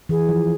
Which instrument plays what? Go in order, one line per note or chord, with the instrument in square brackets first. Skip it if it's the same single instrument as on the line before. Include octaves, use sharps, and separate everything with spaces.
[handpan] E3 [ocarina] G#4
[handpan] F3